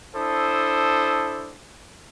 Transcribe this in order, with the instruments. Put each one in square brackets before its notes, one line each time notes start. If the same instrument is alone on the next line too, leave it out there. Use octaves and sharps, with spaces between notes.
[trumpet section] D4 E4 A4 C5 D#6